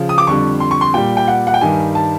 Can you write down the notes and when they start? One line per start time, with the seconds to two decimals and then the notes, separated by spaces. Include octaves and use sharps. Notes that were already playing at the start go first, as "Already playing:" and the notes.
Already playing: C#3 F3
0.09 D#6
0.18 D6
0.27 F2 D3 G3 C#6
0.60 C6
0.71 C#6
0.81 C6
0.94 A#2 G3 G5
1.17 G5
1.28 F#5
1.47 F#5
1.54 G5
1.61 G2 D#3 G3 G#5
1.95 A5